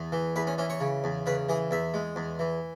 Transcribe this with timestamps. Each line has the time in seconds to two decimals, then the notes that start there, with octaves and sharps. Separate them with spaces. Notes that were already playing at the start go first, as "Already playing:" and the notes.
Already playing: E2
0.12 E3
0.36 E2 B4
0.47 C#4
0.58 E3 C#4
0.70 C#5
0.80 C#3
1.04 E2
1.26 C#3 B4
1.49 E3 G#4
1.71 E2 E5
1.94 G#3
2.16 E2
2.39 E3